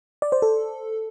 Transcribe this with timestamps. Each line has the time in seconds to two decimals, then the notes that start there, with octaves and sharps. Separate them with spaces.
0.22 D5
0.32 C5
0.42 A4